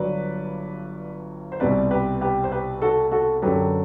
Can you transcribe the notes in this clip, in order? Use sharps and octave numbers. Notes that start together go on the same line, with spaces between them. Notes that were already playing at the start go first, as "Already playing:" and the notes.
Already playing: G1 G2 F#3 B4 D5
C5
C2 B2 G3 C4 B4 D5
G4 B4
G4 B4
C5
G4 B4
F#4 A4
F#4 A4
F#2 D3 F#3 G4 B4